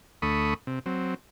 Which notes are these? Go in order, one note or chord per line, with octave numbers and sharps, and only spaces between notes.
D2 A3 B5 C#6 D#6
C3
F#3 C4